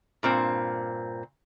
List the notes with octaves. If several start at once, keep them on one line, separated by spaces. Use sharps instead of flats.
G2 A#2 C4